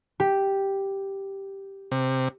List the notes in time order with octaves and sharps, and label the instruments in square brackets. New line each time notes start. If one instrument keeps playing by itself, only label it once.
[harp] G4
[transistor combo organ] C3